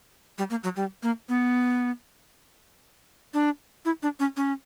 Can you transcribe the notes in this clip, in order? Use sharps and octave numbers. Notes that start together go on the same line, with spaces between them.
G3
A#3
F#3
G3
A#3
B3
D4
E4
D4
C#4
C#4